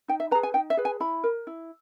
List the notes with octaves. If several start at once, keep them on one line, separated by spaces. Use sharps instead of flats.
D#4 G5
E5
G#4 B4 A#5
G#5
D#4 G5
E5
G#4 B4
G#5
E4 B5
A#4
E4